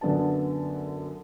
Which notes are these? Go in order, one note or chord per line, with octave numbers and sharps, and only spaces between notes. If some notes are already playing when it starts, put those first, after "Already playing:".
F#2 D3 B3 A5